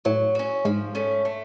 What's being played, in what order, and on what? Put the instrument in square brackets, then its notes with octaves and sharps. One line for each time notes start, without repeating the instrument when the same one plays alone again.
[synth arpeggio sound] A2 [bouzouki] F#3
[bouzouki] C#4 F#4
[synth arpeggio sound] G#2 [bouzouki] F3
[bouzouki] A3 C#4
A3